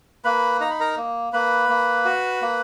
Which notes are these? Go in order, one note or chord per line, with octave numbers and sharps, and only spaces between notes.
A#3 B4 B5
D#4 A#5
B5
A#4 A#5
A#3
A#3 B4 B5
A#3
F#4
A#3